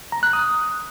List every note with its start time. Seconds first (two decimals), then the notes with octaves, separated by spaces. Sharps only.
0.12 A#5
0.23 F#6
0.33 D#6